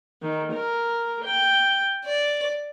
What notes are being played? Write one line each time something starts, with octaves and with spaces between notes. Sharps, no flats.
D#3
A#4
G5
D5